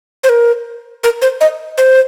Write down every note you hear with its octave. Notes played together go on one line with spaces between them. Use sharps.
C5
A#4
A#4
C5
D#5
C5